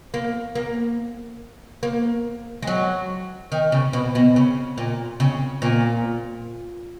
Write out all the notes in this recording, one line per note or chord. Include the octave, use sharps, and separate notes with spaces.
A#3
A#3
A#3
G#3
F#3
D#3
C#3
B2
B2
C#3
A#2
C#3
A#2